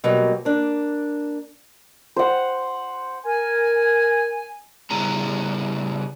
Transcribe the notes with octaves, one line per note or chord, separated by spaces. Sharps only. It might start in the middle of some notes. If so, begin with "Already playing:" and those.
B2 F#3 G3 A#3
A#3 D4
C5 F#5
A#4 G#5
C#3 G3 B3 E4 G#4 A#5